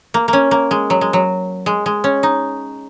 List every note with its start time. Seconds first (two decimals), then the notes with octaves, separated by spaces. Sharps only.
0.14 A#3
0.28 A#3
0.33 C#4
0.51 A#3
0.71 G#3
0.90 F#3
1.01 G#3
1.13 F#3
1.66 G#3
1.86 G#3
2.04 C#4
2.23 D#4